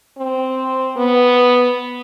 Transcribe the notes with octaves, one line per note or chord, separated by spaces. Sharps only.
C4
B3